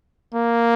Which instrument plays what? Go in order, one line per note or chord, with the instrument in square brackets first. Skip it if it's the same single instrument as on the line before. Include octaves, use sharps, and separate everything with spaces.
[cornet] A#3